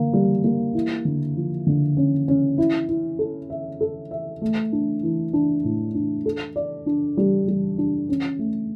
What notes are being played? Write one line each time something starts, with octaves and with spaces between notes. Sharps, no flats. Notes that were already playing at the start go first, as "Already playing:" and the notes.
Already playing: D3 A#3
G3
A#3
E4
D3
F3
D3
C#4
C#4
E4
E4
A4
E5
A4
E5
A3
D4
E3
D4
A2
D4
A4
D5
D4
G3
G3
D4
C#4
A3